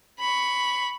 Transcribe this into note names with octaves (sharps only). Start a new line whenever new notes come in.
B5 C#6